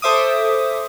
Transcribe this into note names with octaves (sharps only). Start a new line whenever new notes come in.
A4 C5 E5 D6 D#6